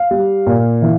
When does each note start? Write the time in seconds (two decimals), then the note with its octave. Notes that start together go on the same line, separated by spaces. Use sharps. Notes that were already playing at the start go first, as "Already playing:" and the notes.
Already playing: F5
0.11 G3
0.47 A#2
0.82 E3